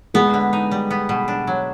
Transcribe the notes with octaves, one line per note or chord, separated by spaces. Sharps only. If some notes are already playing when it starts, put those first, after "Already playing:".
G#3 B3 G#4
D3
D#4
G3
B3
B2
D4
F#3